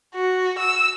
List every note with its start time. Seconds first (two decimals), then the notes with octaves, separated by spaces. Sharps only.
0.14 F#4
0.58 E6